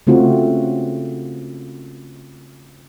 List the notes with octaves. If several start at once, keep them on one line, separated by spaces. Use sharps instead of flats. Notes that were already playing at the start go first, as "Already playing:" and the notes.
C#3 A3 C4 F4 F#4